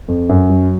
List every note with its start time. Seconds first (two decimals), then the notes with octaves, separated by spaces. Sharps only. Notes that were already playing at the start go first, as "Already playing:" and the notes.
0.08 F2
0.29 F#2
0.49 F#3